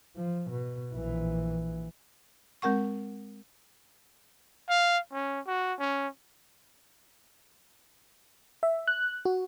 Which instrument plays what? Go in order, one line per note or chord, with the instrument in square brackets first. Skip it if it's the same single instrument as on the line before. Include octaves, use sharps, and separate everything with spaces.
[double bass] F3
B2
A#1 E3
[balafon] G#3 C4 A#4 F#5 C#6
[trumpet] F5
C#4
F#4
C#4
[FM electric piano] E5
F#6
F#4